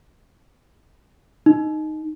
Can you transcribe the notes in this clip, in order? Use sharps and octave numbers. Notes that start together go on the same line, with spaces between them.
D#4